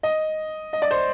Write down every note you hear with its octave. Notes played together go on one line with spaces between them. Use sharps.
D#5
D#5
D5
C5